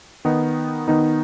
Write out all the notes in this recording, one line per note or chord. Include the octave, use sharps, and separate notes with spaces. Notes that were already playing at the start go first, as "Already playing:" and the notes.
D#3 B3 D#4
D#3 B3 D#4